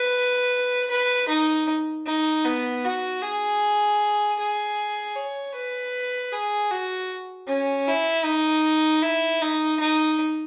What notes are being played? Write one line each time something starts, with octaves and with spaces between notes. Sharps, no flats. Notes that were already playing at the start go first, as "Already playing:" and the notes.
Already playing: B4
B4
D#4
D#4
B3
F#4
G#4
G#4
C#5
B4
G#4
F#4
C#4
E4
D#4
E4
D#4
D#4